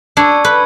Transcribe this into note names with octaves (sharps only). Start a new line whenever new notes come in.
D4 C#6 E6 G#6 C#7
B4